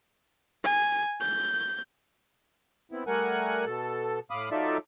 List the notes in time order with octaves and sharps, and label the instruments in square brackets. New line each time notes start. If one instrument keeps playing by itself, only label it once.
[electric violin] G#5
G6
[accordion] B3 C4 E4
G3 A3 A#4 F#5 G#5 F#6
B2 A4
A2 F5 B5 D6 D#6
F#3 D#4 F4 A4 D5 E5